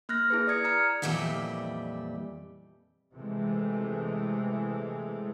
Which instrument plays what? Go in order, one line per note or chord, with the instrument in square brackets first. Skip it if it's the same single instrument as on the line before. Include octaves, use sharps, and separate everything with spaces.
[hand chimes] A#3 F6 F#6 A#6
E4 G#4 B4
D5 D#6 G#6 C#7
A#5 F6 C#7
[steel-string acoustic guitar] F2 A#2 E3 G3 D#5 E5
[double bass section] C3 E3 G#3 A3